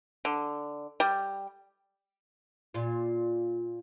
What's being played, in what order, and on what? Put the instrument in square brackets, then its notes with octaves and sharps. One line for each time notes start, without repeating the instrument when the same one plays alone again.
[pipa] D3
G3
[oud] A#2 F4